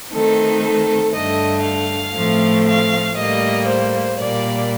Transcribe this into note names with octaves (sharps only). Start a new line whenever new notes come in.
D#3 A3 C4 D#4 A4
A4
G2 D3 A3 D#5
F5
A2 F3 A3 C4
F5
A2 G3 A#3 D#5
C5
A#2 G3 A#3 D5